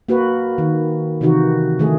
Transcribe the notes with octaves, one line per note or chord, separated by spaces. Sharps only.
A#3 F#4 B4
D#3
C3 D#3 E3 D#4 F#4
D3 D#3 F3 A3 G#4